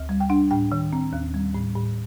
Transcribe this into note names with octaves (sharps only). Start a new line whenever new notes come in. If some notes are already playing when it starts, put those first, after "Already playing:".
Already playing: D2
G3
G5
D4 F#5
A2 G5
D#3
C4
D#2
G3
A2
A2